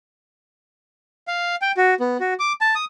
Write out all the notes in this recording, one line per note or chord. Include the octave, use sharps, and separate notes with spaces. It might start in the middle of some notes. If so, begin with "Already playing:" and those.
F5
G5
F#4
B3
F#4
D6
A5
D#6